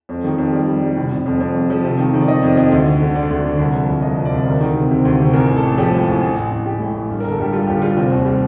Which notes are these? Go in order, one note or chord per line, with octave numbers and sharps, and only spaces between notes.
F2
D#3
F2
G3 D5
G3
G3
F1
F1
F2
F2
F3
F3
C3
D#3
D#3
D5
D#3 D#5
F2
F2
D2
D3
D3
D3 D5
D2
D3
C2
F3
C2
F3 D#5
C2
D5
C2
D2 A#4
D#3
C3
C3
D2
C3
A1 A#4
A1
A4
A1
F3 G4
A2
A1
A1
A1
A1
A1 G4
A2
A1
G2
G1 A#4
A4
G2 G4
G3 F4
G1 G4
G4
G3 F4
F1 C4
D#2
G3